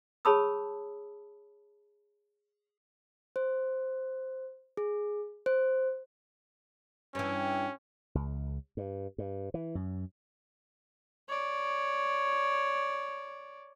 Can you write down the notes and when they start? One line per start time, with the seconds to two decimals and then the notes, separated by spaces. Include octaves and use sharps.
0.25 G#4 C#5 A5 B5 D#6 E6
3.36 C5
4.77 G#4
5.46 C5
7.15 G2 E3 C#4
8.15 C#2
8.77 G2
9.18 G2
9.54 E3
9.75 F#2
11.28 C#5 D5